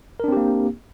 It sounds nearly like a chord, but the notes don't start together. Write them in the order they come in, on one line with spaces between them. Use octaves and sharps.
A#4 D4 C4 G4 A#3